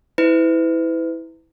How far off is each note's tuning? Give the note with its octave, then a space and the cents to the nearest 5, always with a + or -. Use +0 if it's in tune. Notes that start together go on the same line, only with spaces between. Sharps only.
E4 -20 B4 +35